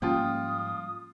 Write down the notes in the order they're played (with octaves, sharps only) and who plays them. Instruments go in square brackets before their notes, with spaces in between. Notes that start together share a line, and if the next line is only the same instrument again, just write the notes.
[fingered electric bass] G#2 F3 G3 [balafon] A#3 C#4 [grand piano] F4 G5 [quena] D#6